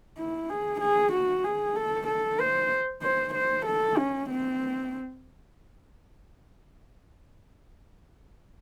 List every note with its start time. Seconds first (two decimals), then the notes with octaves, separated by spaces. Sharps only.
0.18 E4
0.50 G#4
0.81 G#4
1.13 F#4
1.44 G#4
1.76 A4
2.08 A4
2.40 C5
3.03 C5
3.34 C5
3.66 A4
3.98 C#4
4.29 C4